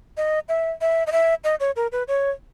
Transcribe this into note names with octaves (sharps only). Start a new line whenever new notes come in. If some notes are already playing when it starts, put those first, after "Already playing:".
D#5
E5
E5
D#5
E5
D#5
C#5
A#4
B4
C#5